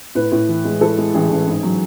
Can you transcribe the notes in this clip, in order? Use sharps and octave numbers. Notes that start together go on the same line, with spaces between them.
A2 B4
A2
E3
G#3
E3 A4
G#3
A1 G#4
A1
G#2
F#3